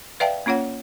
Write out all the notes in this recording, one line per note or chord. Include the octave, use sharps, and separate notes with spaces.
B4 D5 E5 F5 G5 A5
A#3 C#4 F4 C#5 F#5